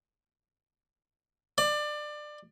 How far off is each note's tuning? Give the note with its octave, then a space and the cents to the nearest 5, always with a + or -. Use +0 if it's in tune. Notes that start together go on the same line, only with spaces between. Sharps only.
D5 +25